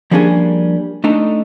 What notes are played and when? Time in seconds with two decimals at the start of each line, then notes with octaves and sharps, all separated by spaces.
0.11 F3 G3 A#3 C#4 D4 G#4
1.04 A3 D4 D#4 A4